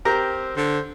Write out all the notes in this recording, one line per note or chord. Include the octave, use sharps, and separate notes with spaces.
C4 G4 A#4 A#5
D3 C5